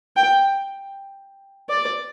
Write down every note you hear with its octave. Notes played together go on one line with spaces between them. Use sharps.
G5
D5